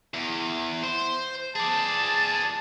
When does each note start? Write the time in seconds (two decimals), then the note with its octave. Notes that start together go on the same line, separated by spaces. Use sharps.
0.14 E2
0.83 C5
1.55 G#4 D5 A5